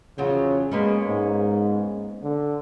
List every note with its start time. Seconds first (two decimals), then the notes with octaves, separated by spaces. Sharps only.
0.18 E2 C#3 F3 F#3
0.72 G#3 A#3 B3 C#4
1.08 G#2
2.23 D3